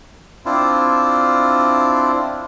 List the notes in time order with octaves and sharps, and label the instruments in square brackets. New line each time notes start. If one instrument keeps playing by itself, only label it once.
[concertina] C4 D4 E4 F4